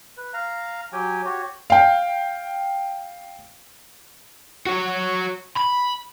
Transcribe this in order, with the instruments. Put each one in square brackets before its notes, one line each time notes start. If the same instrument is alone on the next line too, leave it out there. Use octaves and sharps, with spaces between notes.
[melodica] B4
F5 A#5
F#3 G4 G5 G#5
F#4 G4 C#5
[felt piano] F5 G5
[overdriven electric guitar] F#4 C#5
B5